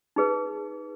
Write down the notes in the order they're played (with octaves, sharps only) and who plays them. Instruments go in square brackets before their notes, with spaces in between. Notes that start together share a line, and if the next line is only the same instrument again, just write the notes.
[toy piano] D#4 G#4 B4